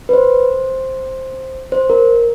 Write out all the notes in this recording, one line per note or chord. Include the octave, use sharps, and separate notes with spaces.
B4
C5
C5
A#4